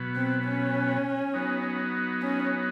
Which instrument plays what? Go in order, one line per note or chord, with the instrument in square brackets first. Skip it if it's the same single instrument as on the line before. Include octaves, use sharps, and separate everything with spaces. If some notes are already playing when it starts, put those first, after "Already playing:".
Already playing: [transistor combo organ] B2 F#3 B3
[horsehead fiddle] C4
C#4
[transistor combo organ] F#3 B3 D#4
[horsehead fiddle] C#4